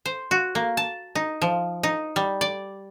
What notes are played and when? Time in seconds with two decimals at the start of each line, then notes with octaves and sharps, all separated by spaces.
0.06 C5
0.31 F#4
0.55 A#3
0.77 A5
1.15 D#4
1.42 F3
1.83 D#4
2.16 G3
2.41 D5